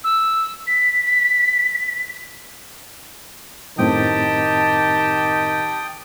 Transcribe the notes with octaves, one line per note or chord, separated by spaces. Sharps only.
E6
B6
F#2 A2 D#3 C4 G4 G5 A5 D#6